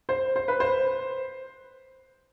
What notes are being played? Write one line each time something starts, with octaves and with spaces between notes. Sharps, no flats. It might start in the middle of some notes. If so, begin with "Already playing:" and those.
C5
C5
B4
C5